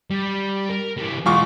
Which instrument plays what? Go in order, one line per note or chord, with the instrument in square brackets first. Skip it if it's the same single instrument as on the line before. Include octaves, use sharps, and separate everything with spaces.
[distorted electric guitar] G3
A#4
E3 G3
[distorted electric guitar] B1 G#3 [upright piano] E2 F4 C#6